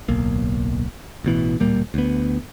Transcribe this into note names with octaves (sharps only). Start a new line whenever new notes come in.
D1 B1 A#3
A1 B2 E3
D1 A#2 G3 A#3
D2 B3